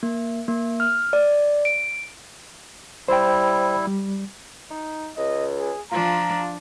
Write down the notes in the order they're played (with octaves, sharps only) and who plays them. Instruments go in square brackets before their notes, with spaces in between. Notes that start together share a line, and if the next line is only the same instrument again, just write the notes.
[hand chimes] A#3
A#3
F6
D5
D7
[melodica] G3 E4 [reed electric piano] C5 G5
[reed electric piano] G3
[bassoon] D#4
[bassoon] C#2 [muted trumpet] D#5
[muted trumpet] G#4
[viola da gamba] F3 D4 [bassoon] F4 [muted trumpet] A#5